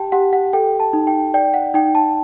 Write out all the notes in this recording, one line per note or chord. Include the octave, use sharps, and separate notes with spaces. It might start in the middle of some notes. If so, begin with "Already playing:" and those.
Already playing: G4 G5 A5
G4 F#5
F#5
A4 G5
A5
D#4
G5
D5 G5
F#5
D#4 G5
A5